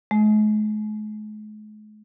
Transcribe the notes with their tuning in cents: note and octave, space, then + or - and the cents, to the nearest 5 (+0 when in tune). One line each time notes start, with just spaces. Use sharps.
G#3 +45